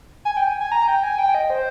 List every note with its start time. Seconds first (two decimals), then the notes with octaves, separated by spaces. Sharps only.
0.25 G#5
0.37 G5
0.60 G#5
0.72 A#5
0.88 G5
1.03 G#5
1.19 G5
1.35 D#5
1.50 C5